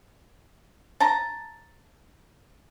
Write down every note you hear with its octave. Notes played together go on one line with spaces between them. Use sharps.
A5 A#5